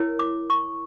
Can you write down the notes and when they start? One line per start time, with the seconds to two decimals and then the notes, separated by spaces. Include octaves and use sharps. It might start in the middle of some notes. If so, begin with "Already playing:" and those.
Already playing: E4 A#4 C#5
0.19 D6
0.50 C#6